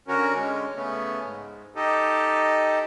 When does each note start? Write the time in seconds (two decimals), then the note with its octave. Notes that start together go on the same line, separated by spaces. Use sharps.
0.08 D3 C#4 F#4 A#4
0.35 D3 G#3 C#4
0.76 C#3 A3 B3 C#4
1.24 G#2
1.76 D#4 G4 A4 D#5